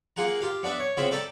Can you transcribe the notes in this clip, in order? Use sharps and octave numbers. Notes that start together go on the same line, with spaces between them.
A#3 F4 G#4 F#5 A#5
F4 G4 F5
B3 D4 B4 E5
C#5
C#3 B3 C4 F4 E5 B5
A4 B4 D5 G5 A5 A#5